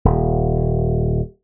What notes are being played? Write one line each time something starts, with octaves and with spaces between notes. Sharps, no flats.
D#1